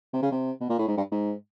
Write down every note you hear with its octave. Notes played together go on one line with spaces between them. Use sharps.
C3
C#3
C3
B2
A#2
A2
G#2
G2
G#2